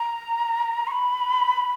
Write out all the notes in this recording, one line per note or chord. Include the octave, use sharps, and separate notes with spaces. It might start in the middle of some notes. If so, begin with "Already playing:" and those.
Already playing: A#5
C#6
B5